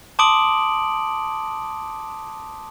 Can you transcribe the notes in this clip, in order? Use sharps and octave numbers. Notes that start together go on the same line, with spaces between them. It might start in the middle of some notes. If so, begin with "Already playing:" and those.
A5 C6 D6 D#6 D7 F#7